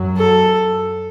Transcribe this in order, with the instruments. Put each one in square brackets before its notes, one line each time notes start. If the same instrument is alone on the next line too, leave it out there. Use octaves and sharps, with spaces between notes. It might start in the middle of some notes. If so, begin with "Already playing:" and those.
Already playing: [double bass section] F#2 F#3
[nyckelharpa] A4